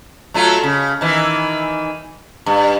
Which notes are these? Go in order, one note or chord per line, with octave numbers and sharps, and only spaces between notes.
F#3 A3 F4
C#3
D#3 E3
G2